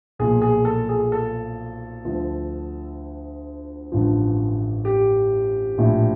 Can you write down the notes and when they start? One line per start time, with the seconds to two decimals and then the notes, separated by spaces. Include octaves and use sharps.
0.19 B1 A#2 F3 G#4
0.42 G#4
0.65 A4
0.89 G#4
1.12 A4
2.05 D2 D3 F3
3.92 A1 G2 D3 F3
4.85 G4
5.78 A#1 A2 F3